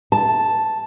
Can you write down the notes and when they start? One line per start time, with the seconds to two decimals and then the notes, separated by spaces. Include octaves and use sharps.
0.12 A5